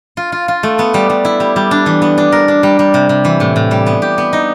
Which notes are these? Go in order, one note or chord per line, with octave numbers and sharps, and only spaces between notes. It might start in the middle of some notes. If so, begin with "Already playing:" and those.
F4
F4
F4
A3
B3
G3
G3
E4
G3
G3
D4
E3
B3
D4
A#4
D4
G3
G3
C3
C3
E3
A2
A2
G3
B3
G4
B3
D#4